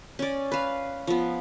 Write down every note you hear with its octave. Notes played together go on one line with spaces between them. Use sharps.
C#4 D5
B4 F5
F3 B3